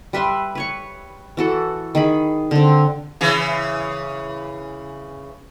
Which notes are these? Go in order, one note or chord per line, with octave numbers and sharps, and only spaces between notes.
G3 B4 E5 C6
B4 C#5 C#6
E3 F#4 A4
D#3 G#4 B5
D3 C4
C#3 E3